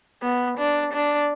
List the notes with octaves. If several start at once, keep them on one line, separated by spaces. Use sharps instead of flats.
B3
D4
D4